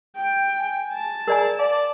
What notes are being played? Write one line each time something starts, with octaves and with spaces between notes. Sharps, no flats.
G5
G#5
A5
G#4 A#4 D5 G#5
D5 F5